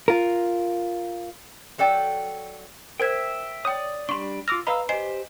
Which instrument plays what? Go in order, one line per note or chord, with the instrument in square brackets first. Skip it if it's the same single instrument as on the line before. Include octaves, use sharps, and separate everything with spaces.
[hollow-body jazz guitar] F4 A#4
[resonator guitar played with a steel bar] F#3 A4 D5 G5
[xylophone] A#4 C5 G#6 [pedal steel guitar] E5 G5
[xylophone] C#5 G5 [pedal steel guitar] D5 D#6
[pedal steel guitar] G3 B3 D4 [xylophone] C6 C#6
[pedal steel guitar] F4 D6 F6 [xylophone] E6 A#6
[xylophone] B4 A#5 B5 [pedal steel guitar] D#5 F5 E6
[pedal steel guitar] G4 C5 [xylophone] D#5 G#5 C7